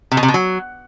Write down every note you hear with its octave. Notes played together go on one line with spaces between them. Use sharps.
C3
B2
C3
B2
F#3